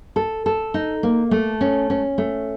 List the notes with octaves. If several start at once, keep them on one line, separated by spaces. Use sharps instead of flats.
A4
A4
D#4
A#3
A3
C#4
C#4
A3